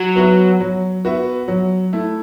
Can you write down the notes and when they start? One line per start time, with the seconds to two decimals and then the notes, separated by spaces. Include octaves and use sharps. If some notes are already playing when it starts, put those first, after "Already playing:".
Already playing: F#3
0.15 B3 F#4 B4 E5
0.60 F#3
1.05 B3 F#4 B4 E5
1.48 F#3
1.93 A3 E4